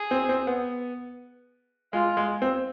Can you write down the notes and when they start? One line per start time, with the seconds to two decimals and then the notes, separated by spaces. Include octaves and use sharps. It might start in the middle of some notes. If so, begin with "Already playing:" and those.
Already playing: G#4
0.11 C4
0.29 C4
0.47 B3
1.93 G#3 F4
2.17 G#3
2.42 C4